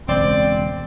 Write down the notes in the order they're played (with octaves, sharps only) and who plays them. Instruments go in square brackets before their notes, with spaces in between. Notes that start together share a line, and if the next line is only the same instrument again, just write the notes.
[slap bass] E1 C#2 [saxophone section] C4 D5